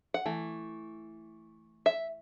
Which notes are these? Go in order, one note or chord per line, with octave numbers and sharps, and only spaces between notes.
F#5
E3 A3
E5